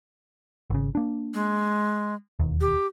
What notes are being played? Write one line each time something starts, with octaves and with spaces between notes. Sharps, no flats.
G#1 C#3
A#3 D4
G#3
E1 D#2
G4